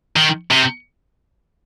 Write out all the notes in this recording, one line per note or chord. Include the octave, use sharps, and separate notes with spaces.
D#3
C3